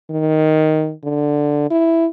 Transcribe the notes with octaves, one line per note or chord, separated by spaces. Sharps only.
D#3
D3
E4